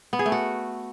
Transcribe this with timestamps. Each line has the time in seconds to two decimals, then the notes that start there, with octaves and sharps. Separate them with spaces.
0.13 B3
0.19 G#4
0.26 A3
0.32 F#4